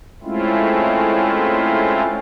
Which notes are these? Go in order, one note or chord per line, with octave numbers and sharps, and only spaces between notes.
G#3 A3 C4 C#4 E4 F4